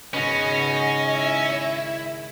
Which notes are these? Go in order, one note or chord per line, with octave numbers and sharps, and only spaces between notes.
G#1 C#3 C#4 F#4 B4 D#5
E4